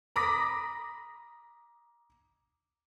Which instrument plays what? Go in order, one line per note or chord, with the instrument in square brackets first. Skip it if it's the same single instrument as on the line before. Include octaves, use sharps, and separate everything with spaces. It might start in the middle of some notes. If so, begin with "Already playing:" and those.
[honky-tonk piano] A#5 B5 D6 D#6 A#6 B6